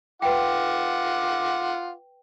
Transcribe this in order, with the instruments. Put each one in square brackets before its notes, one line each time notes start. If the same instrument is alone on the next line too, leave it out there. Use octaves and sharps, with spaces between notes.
[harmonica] F4 F#5 D6 [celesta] B4 G5